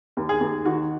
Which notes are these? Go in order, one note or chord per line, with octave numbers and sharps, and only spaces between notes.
D#2
G#4
D#2
D#3 F#4